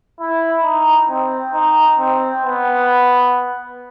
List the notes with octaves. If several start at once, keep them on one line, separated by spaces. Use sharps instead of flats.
E4
D#4
C4
D#4
C4
B3